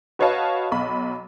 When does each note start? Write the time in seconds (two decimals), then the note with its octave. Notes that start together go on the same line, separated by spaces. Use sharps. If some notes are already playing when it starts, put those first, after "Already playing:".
0.19 F#4 B4 C#5 D#5 F5 A5
0.72 B1 B5